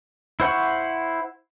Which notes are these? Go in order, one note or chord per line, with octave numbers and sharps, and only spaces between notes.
E4 C5 F#5 C#6